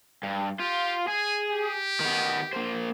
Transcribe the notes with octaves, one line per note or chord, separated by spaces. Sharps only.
G2
F4 G4
G#4 G#5
G4
D#3 B3
A#3 C5